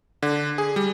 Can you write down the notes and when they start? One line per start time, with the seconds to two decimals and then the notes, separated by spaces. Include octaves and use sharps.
0.23 D3
0.58 G#4
0.76 G3